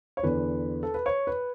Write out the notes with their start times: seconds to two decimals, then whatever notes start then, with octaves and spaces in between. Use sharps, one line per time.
0.17 C#5
0.23 E2 D3 B4
0.83 A4
0.94 B4
1.06 C#5
1.27 B4